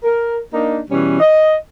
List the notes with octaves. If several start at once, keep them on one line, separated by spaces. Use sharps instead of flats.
A#4
A#3 D4 D#4
B2 E3 G3 C#4
D#5